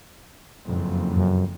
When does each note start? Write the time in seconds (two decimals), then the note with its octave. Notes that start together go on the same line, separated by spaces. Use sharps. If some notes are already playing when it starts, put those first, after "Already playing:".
0.65 F#1 F2
1.16 F#2